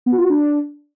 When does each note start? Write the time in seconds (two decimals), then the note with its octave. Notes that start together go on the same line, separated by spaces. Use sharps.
0.06 B3
0.12 F#4
0.18 F4
0.24 F#4
0.30 D4